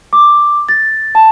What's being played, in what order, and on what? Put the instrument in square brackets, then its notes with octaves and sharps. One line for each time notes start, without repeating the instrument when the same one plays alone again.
[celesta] D6
A6
A5